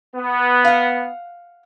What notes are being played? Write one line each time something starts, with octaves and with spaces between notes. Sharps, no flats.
B3
F5 F#5